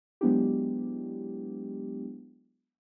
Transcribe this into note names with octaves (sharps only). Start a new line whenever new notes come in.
F#3 G#3 B3 D4 E4 G4